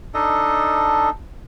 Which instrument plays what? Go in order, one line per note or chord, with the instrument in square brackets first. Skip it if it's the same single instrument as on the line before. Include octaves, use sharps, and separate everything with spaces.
[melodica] D4 D#4 A4 D#5